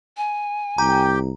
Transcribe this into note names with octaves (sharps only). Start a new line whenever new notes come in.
G#5
C2 G4 G5 A#5